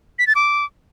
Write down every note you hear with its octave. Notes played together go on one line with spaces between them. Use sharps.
B6
A6
D6